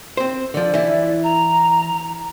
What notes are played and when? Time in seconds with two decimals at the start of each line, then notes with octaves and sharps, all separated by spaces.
0.17 C4 C5
0.54 D3 F3 D5
0.74 E3 E4
1.24 A#5